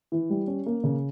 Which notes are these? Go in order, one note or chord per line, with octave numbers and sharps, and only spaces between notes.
E3
G3
C#4
A#3
C#3